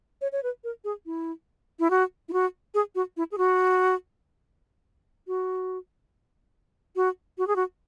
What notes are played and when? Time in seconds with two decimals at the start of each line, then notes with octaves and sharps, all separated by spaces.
0.21 C#5
0.32 C#5
0.43 B4
0.64 A#4
0.84 G#4
1.06 E4
1.79 E4
1.90 F#4
2.29 E4
2.33 F#4
2.74 G#4
2.95 F#4
3.17 E4
3.32 G#4
3.38 F#4
5.27 F#4
6.96 F#4
7.38 F#4
7.47 G#4
7.56 F#4